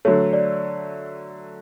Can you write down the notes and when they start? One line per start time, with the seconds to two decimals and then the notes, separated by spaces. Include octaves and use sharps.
0.05 D3 F#3 A3 C#5
0.33 D5